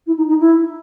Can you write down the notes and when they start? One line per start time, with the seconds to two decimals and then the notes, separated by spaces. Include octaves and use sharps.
0.06 E4
0.17 D#4
0.28 D#4
0.39 E4